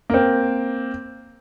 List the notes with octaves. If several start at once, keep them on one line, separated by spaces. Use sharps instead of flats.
A#3 C4